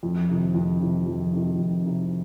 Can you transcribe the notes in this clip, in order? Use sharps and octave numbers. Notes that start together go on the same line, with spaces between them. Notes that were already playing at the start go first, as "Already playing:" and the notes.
F2
C3 D#3
F2
C3 D#3
F2
C3 D#3
F2
C3 D#3